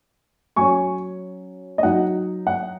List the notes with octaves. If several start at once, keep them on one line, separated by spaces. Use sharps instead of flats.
F#3 C#4 G#5 C#6
D#5
F#3 D#4 F#5
F#5